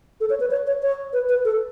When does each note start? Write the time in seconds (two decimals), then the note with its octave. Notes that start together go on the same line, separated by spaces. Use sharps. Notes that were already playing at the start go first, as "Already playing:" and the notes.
0.21 A4
0.30 C#5
0.40 B4
0.51 C#5
0.67 C#5
0.82 C#5
1.13 B4
1.29 B4
1.45 A4